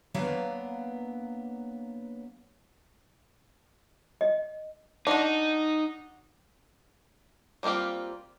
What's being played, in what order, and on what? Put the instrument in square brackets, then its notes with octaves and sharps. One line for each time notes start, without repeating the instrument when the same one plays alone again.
[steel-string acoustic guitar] F#3 A#3 B3 D4 B4 F5
[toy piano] D#5
[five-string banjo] D4 F#4 [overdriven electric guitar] D#4
[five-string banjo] G3 A#3 C4 F4 G4